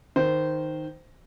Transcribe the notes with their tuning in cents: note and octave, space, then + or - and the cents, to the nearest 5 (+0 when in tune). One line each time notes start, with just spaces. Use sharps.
D#3 +0 C5 -15